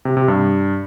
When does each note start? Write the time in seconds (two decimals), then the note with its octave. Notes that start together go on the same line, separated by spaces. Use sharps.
0.05 C3
0.17 C3
0.28 G2